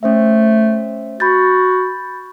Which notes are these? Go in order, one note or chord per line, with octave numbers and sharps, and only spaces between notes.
A3 C#4 C5 E5
F#4 B5 G6 A6